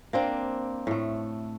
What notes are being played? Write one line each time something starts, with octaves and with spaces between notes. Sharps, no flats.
A#3 C4 D4
A2 A3